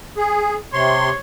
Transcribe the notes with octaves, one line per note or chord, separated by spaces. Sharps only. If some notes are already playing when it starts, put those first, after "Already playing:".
G#4
C3 C#5 C6